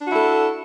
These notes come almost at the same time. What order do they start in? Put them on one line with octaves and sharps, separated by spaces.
D4 F#4 E4 A4